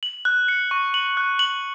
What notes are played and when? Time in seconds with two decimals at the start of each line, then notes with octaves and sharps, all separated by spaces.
0.03 F#7
0.25 F#6
0.48 C#7
0.71 C#6
0.94 F#7
1.17 F#6
1.39 F#7